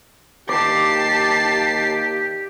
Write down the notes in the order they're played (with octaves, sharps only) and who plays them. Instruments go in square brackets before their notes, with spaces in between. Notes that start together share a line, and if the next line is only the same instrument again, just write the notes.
[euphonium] D#2 [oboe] G4 [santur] D5 [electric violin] A5 C7